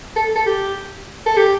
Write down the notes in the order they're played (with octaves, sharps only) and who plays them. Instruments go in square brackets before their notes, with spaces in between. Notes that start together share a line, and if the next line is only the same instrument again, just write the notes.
[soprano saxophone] A4
A4
G4
A4
G4